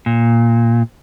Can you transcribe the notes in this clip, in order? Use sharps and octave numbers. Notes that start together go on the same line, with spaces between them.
A#2